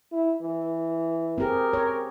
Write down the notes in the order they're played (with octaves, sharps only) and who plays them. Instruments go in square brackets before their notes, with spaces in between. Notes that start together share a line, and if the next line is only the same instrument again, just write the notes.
[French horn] E4
E3
[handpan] C4 G4 G#4 [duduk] A#4
[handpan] C#5